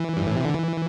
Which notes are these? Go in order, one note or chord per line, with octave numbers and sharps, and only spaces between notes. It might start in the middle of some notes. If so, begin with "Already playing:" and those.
Already playing: E3
G2
A2
C3
D3
E3